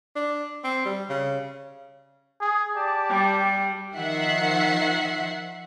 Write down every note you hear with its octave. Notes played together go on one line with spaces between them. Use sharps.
D4
C4
G3
C#3
G#4
G4 D5 A5
G3
D#3 F3 E5 F#5 C7